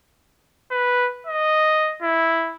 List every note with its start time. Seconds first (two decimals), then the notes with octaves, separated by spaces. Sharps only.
0.71 B4
1.27 D#5
2.03 E4